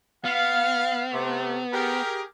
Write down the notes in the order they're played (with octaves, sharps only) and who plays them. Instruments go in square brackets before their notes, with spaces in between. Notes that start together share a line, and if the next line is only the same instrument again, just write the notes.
[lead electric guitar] B3 [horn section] F5
[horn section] C3 A3
G4 G#4 A#4